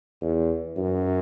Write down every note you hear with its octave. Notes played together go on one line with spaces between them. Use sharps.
E2
F#2